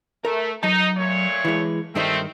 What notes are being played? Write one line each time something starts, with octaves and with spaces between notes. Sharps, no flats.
A3 A#4
F#3 D#4 A5
A#2 A3 C#5
E3 G#3
G2 D#3 A3 C4 D#4